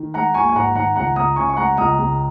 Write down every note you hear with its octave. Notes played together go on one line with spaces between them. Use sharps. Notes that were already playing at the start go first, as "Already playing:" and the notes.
Already playing: D#3
G#3 F#5 A#5
A#1 G#5 C#6
G#5
G#2 F#5 A#5
D#3 F#5 A#5
C#2 F#5 A#5
C#2 A#5 D#6
C#3 G#5 C#6
C#6
G#3 F#5 A#5
C#2 A#5 D#6
C#2